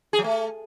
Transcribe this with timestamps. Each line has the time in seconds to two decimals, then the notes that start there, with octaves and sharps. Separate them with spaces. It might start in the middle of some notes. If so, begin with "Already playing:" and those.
0.13 G#4
0.19 F#3
0.24 A3